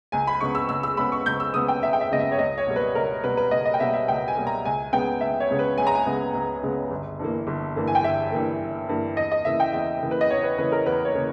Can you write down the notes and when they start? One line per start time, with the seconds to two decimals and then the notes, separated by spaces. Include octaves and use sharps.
0.12 C#2 G#5
0.27 B5
0.41 C#3 G#3 B3 C#6
0.55 E6
0.69 C#2 E6
0.83 E6
0.97 C#3 G#3 B3 B5
1.12 C#6
1.26 C#2 G6
1.40 E6
1.54 C#3 G#3 B3 D#6
1.68 G5
1.82 C#2 E5
1.93 G5
2.01 E5
2.11 C#3 G#3 B3 D#5
2.20 E5
2.32 C#5
2.39 C#2 D#5
2.58 C#5
2.67 B2 G3 A#3
2.76 B4
2.95 C#2 A#4
3.24 B2 G3 A#3 B4
3.37 B4
3.51 C#2 D#5
3.66 D#5
3.74 G5
3.80 B2 G3 A#3 E5
3.94 E5
4.08 C#2 G5
4.28 G#5
4.36 B2 G3 A#3
4.47 A#5
4.65 C#2 G#5
4.93 C#3 G#3 B3 G5
5.21 C#2 E5
5.40 C#5
5.50 C#3 G#3 B3
5.59 B4
5.78 C#2 G#5
5.87 A#5
5.95 G#5
6.06 C#3 G#3 B3
6.34 C#2
6.63 C#3 G#3 B3
6.91 G1
7.19 G2 E3 A#3
7.47 G1
7.76 G2 E3 A#3
7.87 G#5
7.95 G5
8.03 G1 E5
8.32 G2 E3 A#3
8.60 G1
8.89 G2 E3 A#3
9.16 E2 D#5
9.32 D#5
9.45 C#3 E3 A#3 E5
9.60 G5
9.73 E2 E5
10.02 C#3 E3 A#3
10.11 B4
10.21 D#5
10.30 E2 C#5
10.43 B4
10.58 C#3 E3 A#3 B4
10.72 A#4
10.86 E2 B4
11.05 C#5
11.15 C#3 E3 A#3